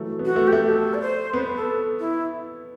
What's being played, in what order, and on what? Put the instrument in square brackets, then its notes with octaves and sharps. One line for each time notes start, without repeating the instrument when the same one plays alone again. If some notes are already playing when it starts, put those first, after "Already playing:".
Already playing: [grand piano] E3 F#3 A3
B3
[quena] F#4
[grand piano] A3
[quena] G4
[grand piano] A3
[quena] A4
D5
C5
[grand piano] B3 [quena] B4
[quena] A4
E4